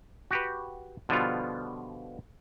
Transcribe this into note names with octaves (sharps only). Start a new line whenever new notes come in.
F#4 G4 B4
B2 D3 F3 G3 B3 F4